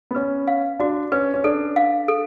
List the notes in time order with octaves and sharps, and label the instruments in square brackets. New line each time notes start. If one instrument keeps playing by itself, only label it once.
[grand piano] B3
[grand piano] C#4 [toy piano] B4
[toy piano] F5
[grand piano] D4 [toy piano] F#4
[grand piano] C#4 [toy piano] B4
[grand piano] C#4
[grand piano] D4 [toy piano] A4
[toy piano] F5
A4